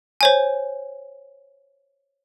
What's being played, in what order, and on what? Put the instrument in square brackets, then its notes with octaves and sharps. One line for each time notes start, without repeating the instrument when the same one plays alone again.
[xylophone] C5 C#5 G#5